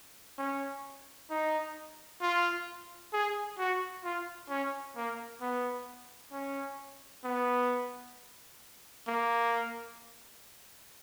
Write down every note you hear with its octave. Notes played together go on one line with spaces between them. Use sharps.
C#4
D#4
F4
G#4
F#4
F4
C#4
A#3
B3
C#4
B3
A#3